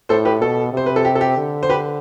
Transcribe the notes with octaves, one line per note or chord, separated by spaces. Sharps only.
A2 A4 C5
G4 B4
B2 A4
C3 C5
B4
A4
G4
A4
G4
D3
C5
G4 B4